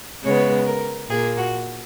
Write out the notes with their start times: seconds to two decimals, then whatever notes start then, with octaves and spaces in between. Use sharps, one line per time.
0.24 C#3 G#3 B3 C#5
0.66 A#4
1.08 A#2 A#3 G#4
1.37 F#4